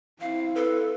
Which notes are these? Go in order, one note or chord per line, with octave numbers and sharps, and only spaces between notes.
C4 E4 F5
A4 B4